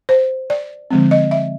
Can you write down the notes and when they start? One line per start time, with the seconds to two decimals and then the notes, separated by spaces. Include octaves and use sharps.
0.09 C5
0.50 D5
0.91 D3 F3 G#3 C4
1.11 D#5
1.31 E5